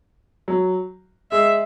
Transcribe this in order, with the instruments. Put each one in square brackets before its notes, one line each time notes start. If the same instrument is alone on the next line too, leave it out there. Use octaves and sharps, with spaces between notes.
[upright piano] F#3
[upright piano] G#3 [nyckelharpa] E5